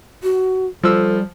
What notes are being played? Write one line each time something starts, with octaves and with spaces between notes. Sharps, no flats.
F#4
F3 G3 A4 E6